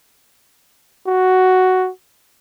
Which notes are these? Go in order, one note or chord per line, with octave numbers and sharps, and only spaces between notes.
F#4